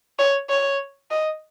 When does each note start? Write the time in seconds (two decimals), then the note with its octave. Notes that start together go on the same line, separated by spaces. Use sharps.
0.19 C#5
0.49 C#5
1.11 D#5